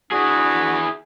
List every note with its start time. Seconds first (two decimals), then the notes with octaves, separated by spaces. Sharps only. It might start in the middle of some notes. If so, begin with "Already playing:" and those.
0.12 D4 E4 F#4 G#4